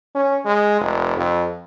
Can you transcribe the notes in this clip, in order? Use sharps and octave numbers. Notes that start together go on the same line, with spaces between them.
C#4
G#3
F1
F2